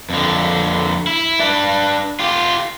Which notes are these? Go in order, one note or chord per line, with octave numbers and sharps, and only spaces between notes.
F2 D3
E4
D4 B4
F4 G4